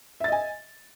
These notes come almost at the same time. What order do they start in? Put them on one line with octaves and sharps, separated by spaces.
E5 A6 D#5 G#5